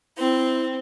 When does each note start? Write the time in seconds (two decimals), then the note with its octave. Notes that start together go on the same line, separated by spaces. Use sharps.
0.18 C4 E4